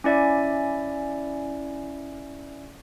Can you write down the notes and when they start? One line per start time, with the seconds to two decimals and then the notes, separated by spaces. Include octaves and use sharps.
0.04 C#4 E4 D5 E5 G#5